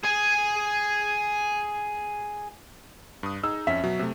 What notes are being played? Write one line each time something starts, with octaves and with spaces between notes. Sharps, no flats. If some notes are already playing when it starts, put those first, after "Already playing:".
G#4 G#5
G2 D#6
D#4 G#4 A#5 E6
F2 C#4 E5
B2 F#3
C3 A3